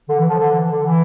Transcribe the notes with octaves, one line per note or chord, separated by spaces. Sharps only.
D3
E3
D3 F3
D3
E3
D3
E3